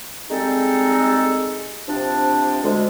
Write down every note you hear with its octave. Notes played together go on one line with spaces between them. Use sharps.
G3 G#3 C4 D#4 A4
C3 F3 D4
D2 G#3